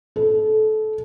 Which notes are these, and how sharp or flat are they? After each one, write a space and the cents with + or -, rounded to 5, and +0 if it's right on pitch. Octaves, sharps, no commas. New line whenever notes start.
A4 -25